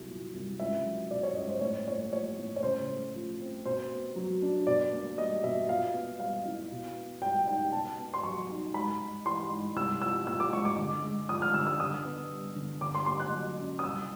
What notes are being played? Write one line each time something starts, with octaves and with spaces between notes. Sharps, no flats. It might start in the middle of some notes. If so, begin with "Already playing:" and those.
Already playing: C2 F#3
A#2
C2
C#2 E5
F#3
B2 D5
C#5
C#2 D#5
C5
A2 C#5
A#3 C#5
F3 C#5
A2
C#5
C#3 C5
A3
F3
C4
B2 C5
B3
F#3
D4
B2 D5
A#3
G3 D#5
B2 E5
A#2 F5
B3
G3 F5
E4
B2
B3
G3 G5
D#4 G5
B2 A5
B3
C6
F#3 C#6
D#4
G#2 B5
G#3
E3 C6
G#2
C2 E6
F3 E6
A#2 E6
D6
G#3 C#6
D6
D3
G#3
F3 D#6
F6
D3 E6
E6
D3 D#6
B3
G3
D3
D3 D6
C6
A#3 C6
F#6
F#3
C#4
D#6
C2 E6